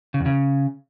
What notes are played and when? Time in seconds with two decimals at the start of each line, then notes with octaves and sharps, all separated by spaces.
0.14 C#3
0.20 E2
0.26 C#3